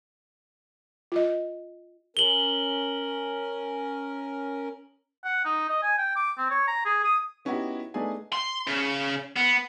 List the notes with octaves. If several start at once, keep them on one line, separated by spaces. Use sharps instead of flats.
F4 D#5
C#4 A#4 F#7 G7
F#5
D#4
D#5
G#5
G5
D6
C4
C#5
A#5
G#4
D#6
B3 C#4 D#4 E4 F#4 G4
A3 B3 D4 D#4 G#4 G#5
C6
C#3
B3